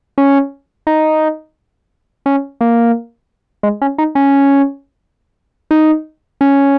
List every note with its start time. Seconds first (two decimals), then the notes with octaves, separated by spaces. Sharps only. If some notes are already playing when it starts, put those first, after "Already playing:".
0.18 C#4
0.87 D#4
2.26 C#4
2.61 A#3
3.63 G#3
3.82 C#4
3.98 D#4
4.15 C#4
5.71 D#4
6.41 C#4